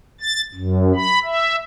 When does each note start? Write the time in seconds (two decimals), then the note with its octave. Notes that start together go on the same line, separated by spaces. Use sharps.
0.21 A6
0.55 F#2
0.95 B5
1.24 E5